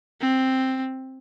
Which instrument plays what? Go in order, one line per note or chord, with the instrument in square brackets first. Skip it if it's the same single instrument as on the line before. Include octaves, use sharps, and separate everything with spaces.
[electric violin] C4